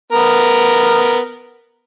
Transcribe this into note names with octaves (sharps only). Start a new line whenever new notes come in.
B3 A#4